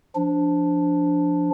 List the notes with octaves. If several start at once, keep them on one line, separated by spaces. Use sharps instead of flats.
F3 D4